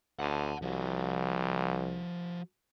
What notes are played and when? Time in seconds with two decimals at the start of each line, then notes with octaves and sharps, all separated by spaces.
0.19 D2 F#5 A5
0.62 C2 F3 F#4